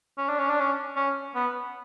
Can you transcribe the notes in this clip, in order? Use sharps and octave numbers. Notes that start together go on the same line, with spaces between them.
C#4
D4
C#4
D4
C#4
C#4
B3